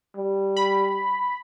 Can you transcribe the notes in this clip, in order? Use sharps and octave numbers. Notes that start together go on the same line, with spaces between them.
G3
B5